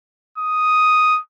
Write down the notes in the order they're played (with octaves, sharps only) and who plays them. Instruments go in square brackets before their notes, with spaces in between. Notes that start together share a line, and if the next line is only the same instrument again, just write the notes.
[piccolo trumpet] D#6